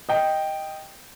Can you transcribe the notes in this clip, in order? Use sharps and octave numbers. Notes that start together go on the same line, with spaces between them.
D#5 G5